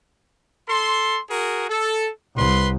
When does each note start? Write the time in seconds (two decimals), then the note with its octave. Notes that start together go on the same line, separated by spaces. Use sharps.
0.69 A4 C6
1.29 F#4 G#4 A#4
1.69 A4
2.36 C2 B4 C6